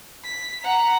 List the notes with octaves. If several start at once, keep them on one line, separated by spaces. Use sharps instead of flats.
B6
F#5 A#5